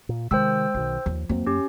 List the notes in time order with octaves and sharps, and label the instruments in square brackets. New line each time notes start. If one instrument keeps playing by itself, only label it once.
[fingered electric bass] A#2
[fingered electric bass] C3 D#3 [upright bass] G#3 [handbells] C5 G5 E6
[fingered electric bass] B1 B2 D#3 [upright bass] D#4
[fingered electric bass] D#2 [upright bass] F3
[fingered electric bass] F2 F#3 C4 [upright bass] A#3
[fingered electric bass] F#2 [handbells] C#4 G4